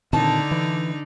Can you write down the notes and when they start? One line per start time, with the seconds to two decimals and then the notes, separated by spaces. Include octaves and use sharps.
0.13 A#2 D3 D#3 C4 D4 D#4 A5
0.51 E3